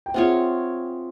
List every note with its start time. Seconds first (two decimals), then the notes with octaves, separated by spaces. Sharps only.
0.06 G5
0.14 C4 F4 G#4 C#5 E5 F#5